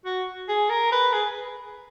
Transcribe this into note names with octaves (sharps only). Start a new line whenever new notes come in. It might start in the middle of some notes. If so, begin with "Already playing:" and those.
F#4
G#4
A#4
B4
G#4